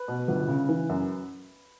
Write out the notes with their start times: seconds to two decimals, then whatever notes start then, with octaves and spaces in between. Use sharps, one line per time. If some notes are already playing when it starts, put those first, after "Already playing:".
Already playing: B4
0.08 B2
0.28 G1
0.48 C#3
0.69 E3
0.89 F#2